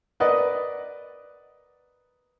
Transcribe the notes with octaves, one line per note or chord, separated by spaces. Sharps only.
A#4 B4 D5 D#5 F#5